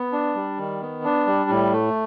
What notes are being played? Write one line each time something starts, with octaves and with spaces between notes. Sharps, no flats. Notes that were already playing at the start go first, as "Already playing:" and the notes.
Already playing: B3
D4
G3
D#3
B3
D4
G3
A2
A3